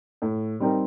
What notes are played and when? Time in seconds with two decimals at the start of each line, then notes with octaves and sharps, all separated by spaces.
0.22 A2
0.60 G3 C4 D#4 A#4